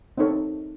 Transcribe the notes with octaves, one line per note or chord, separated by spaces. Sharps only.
C4 D#4 A4 C#5